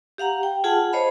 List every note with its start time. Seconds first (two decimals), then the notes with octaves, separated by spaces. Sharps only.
0.18 G4 F5 F#5 A#5
0.43 G5
0.64 F4 G#4 F#5 G#5 A5
0.93 C5 C#5 D#5 F5 B5